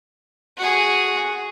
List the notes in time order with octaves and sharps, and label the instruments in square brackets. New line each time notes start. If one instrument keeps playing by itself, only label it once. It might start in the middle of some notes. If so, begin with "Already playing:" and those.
[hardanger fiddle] F#4 G#4